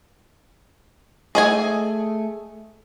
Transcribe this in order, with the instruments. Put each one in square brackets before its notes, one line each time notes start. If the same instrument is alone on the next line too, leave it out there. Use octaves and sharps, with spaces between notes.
[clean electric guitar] A3 [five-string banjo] G#4 D#5 G#5